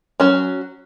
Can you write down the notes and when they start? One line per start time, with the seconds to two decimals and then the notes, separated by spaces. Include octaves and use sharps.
0.20 F#3 C#4